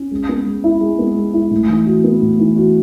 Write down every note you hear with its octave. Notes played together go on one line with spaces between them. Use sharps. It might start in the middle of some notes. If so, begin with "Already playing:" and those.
Already playing: C#4
G#3
B3
G#3
E4
G#3
B3
G#3
E4
A2
E3
F#4
B3
A2
E3
F#4